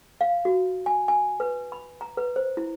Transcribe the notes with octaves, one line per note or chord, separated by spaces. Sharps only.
F5
F#4
G#5
G#5
B4
B5
A#5
B4
C5
E4